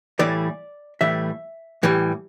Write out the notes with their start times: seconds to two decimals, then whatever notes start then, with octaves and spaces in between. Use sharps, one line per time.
0.19 A2 E3 G3 D5
1.01 A2 E3 G3 E5
1.83 A2 E3 G3